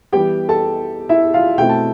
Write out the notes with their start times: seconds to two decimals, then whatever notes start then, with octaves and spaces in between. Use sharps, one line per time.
0.12 E3 G3 B3 G4 G5
0.49 A4 A5
1.09 E4 E5
1.34 F4 F5
1.58 B2 A3 C4 E4 G5
1.69 A5